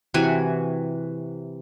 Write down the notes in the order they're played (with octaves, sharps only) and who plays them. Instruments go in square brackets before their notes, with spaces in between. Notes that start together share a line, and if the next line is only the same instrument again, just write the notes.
[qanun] C3 E3 F#4 G#5